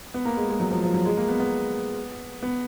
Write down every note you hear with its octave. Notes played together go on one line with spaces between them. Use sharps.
B3
A#3
G#3
G#3
F#3
F3
F3
F#3
G#3
A#3
B3
B3
B3